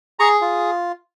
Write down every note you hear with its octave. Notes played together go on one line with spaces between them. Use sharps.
G#4 A#5 C#6
F4